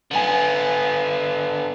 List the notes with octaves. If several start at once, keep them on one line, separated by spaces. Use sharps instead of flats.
D3 B3 G#5 F#7